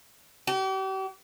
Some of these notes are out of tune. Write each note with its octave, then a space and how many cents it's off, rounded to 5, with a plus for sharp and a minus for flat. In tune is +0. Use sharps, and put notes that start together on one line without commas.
G4 -40